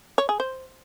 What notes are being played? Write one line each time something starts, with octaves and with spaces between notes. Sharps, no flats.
C#5
G#4
C5